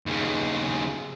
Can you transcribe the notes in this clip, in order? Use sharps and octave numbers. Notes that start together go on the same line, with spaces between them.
D#2 C#3